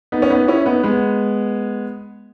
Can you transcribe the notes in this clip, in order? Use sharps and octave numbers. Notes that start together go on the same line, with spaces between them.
B3 D#4
C#4
B3 D#4
C#4 E4
B3 D#4
G#3 B3